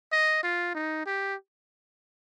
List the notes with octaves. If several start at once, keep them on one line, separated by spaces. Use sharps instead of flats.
D#5
F4
D#4
G4